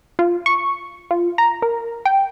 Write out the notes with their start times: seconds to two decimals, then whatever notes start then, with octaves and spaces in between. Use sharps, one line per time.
0.19 F4
0.46 C#6
1.11 F4
1.38 A#5
1.62 A#4
2.05 G5